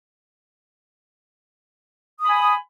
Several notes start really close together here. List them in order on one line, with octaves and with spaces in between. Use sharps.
D#6 B5 G#5